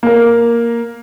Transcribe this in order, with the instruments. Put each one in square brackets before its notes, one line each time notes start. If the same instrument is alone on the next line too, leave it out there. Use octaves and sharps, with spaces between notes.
[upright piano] A#3 A#4